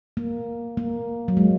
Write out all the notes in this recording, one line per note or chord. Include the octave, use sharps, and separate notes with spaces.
A#3
A#3
F#3
G#3